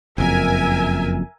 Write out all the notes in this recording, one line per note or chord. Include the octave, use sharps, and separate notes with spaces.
F#1 F2 A#4 E5 G#5